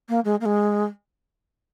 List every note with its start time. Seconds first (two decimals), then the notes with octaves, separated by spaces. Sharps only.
0.09 A#3
0.25 G#3
0.41 A#3
0.45 G#3